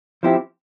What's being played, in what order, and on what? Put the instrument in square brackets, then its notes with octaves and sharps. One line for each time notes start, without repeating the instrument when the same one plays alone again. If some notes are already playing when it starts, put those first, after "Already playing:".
[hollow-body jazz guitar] F3 C4 E4 G4